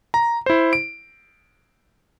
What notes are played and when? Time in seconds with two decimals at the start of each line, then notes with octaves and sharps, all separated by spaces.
0.14 A#5
0.46 E4 C5
0.73 D7